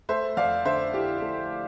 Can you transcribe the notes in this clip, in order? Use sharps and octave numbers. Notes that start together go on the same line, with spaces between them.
A3 C5 E5
F2 D5 F5
D3 C5 E5
E4 G4
A3